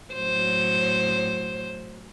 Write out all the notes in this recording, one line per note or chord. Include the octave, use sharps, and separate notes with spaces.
A2 F#3 C5